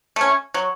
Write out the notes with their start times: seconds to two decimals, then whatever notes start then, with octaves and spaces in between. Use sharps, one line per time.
0.16 A3 C#4
0.54 F#3